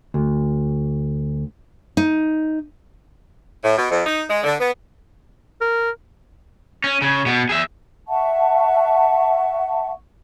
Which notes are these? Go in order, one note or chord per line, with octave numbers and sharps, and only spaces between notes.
D2
D#4
A2
B2
F2
D#4
G#3
D3
B3
A#4
C#4
C#3
B2 B3
G#4 E5
E5 F#5 A5 C#6